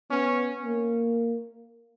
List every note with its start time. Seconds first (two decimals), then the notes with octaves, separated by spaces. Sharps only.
0.11 B3 C#4
0.63 A#3